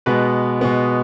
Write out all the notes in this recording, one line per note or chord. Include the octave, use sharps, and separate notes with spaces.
B2 G#3 B3 B4
B2 G#3 B3